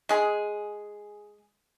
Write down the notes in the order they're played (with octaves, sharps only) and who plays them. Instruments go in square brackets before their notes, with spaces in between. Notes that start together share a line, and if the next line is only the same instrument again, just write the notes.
[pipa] G#3 G#4